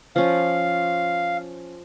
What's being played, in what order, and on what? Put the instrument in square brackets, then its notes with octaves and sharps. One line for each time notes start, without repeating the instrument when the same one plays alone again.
[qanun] F3 C#4 [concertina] F5